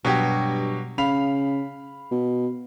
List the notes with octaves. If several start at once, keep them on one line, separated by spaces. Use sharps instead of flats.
G2 B2 F#3 G4
C#3 F5 B5 F7
B2